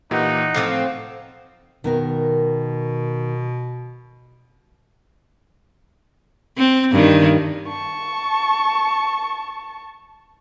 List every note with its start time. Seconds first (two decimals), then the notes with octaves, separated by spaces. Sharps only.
0.11 A#2 E3 D#4 G4 F#5
0.55 A2 F3 C4 F5 D6 C7
1.84 B2 D#3 B3 A#4
6.57 C4
6.92 G2 D#3
7.67 A5 C#6